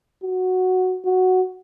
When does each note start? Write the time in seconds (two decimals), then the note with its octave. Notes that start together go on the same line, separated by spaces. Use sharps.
0.24 F#4
1.05 F#4